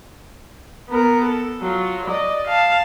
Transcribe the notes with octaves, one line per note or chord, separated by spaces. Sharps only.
B3 A#4
A4
F#3 F4
D5 D#5
F5 A5